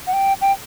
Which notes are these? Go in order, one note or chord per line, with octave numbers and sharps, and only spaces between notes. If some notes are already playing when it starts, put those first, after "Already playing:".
F#5
G5
G5